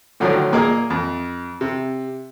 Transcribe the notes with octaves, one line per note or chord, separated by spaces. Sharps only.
A2 D3 D#3 F3 F#3
A#2 A#3 G#4 A#4 D#5 G#5
F2
C3